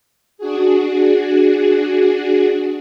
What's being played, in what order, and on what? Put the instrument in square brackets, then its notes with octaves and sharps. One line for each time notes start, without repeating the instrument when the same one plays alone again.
[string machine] D4 F#4 G#4